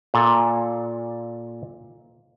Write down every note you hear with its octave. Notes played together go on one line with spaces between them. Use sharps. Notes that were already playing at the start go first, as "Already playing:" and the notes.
A#2 A4